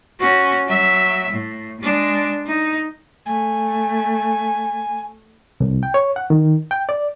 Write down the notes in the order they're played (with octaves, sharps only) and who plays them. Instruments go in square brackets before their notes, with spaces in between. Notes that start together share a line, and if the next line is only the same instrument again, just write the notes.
[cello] C#4 F#4
F#3 E5
A2
G#3 D4
D#4
[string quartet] A3 [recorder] G#5
[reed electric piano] C2
G5
C#5
F#5
D#3
G5
D5